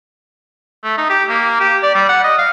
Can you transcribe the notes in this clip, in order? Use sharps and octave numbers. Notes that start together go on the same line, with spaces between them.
A3
D#4
G4
A#3
G4
D5
G3
F#5
D#5
F5